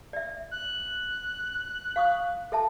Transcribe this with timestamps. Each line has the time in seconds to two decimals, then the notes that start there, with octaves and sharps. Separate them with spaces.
0.13 D5 E5
0.51 F#6
1.96 F5 C#6 D#6
2.52 A4 E5 A5